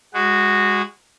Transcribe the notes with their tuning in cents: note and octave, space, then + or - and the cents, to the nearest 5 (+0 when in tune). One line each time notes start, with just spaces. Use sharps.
G#3 -20 F#4 +0